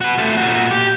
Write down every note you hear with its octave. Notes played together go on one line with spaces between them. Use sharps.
F#4 B4
A3 F4
A#2 F#4
G4